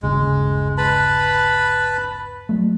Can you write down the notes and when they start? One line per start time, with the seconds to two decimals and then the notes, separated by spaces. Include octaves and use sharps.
0.03 G1 D#2 C#3 G#3
0.78 B4 A5 B5
2.49 F#3 A3